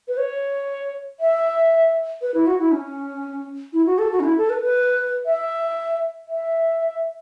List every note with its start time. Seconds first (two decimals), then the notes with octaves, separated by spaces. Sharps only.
0.08 B4
0.17 C#5
1.20 E5
2.22 B4
2.34 E4
2.47 F#4
2.59 E4
2.72 C#4
3.73 E4
3.86 F#4
3.99 A4
4.12 F#4
4.20 C#4
4.25 E4
4.38 A4
4.50 B4
4.63 B4
5.26 E5
6.28 E5